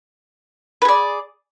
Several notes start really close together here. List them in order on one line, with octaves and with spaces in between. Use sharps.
B4 G#4 D5